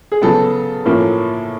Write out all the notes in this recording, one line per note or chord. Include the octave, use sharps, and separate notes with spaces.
G#4
C#3 F#3 B3 A4
A2 F3 A#3 C#4